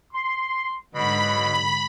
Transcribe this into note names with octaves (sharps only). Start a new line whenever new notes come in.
C6
G#2 B2 D3 F#3 B5